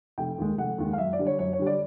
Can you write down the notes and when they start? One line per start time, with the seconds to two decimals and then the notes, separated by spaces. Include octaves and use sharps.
0.18 F1 G5
0.38 D#2 D#3 G#3
0.58 F1 F#5
0.78 D#2 D#3 G#3
0.93 F5
0.98 F#2 E5
1.13 D5
1.19 D3 G3
1.26 C#5
1.39 F#2 C#5
1.53 C#5
1.59 D3 G3
1.66 D5